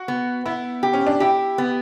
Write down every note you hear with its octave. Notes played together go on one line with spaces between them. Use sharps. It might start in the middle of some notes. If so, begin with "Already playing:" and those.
Already playing: F#4
B3
B3 E4
G4
C#4
D4
E4 G4
B3